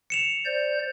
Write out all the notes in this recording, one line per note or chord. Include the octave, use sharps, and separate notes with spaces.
C#7 E7 F7
C5 D5 G6